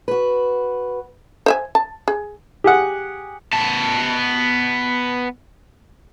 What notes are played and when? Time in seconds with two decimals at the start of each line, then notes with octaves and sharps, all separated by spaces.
0.08 F#4 B4
1.46 C5 E5 G#5
1.75 A5
2.08 G#4
2.64 G4 G#4 F#5
3.53 B3 A5